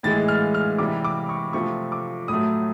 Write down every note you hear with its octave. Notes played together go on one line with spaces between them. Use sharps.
A2 E3 G#3 A6
F6
F6
C3 E3 G3 D6
D6
C#6
C3 F3 A3 C#6
D6
A2 F#3 A3 D#6